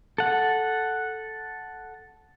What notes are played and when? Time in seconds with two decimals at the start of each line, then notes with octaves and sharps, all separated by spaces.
0.18 A4 F#5